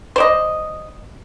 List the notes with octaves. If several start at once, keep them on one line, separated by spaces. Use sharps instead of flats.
C5 D5 D#5